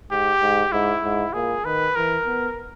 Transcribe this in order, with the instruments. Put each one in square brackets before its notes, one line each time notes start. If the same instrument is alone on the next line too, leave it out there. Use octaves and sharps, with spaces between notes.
[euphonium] G#2 [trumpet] G4
[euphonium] G#2
[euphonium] G#2 [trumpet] E4
[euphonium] G#2
[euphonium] A#2 [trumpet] G#4
[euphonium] D#3 [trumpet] B4
[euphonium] E3 [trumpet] A#4
[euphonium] B3